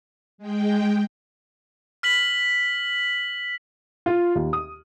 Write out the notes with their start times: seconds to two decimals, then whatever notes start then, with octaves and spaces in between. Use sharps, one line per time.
0.38 G#3 G5
2.03 F6 B6 F#7
4.06 F4
4.35 D#2
4.53 D#6